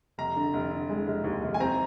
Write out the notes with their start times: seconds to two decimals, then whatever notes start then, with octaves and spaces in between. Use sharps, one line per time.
0.18 F1 A#5
0.36 D3
0.53 F1
0.72 D3
0.89 G#3
1.07 F1
1.24 D#2
1.42 F1
1.54 G#5
1.60 C4 A#5